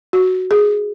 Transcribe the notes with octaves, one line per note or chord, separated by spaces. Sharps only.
F#4
G#4